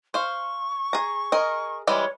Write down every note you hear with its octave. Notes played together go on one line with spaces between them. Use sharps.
C5 F5 C#6
G#4 A#5
G#4 A#4 D#5
E3 G3 G#3 C#5